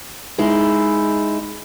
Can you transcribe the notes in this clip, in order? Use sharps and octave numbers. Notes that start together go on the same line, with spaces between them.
G#3 D#4 E4